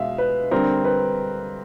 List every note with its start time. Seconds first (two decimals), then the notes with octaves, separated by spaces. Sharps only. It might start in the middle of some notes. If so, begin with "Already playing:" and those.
Already playing: B2 G#3 E5 F5
0.18 B4
0.51 D3 G3 C4 A#4
0.85 B4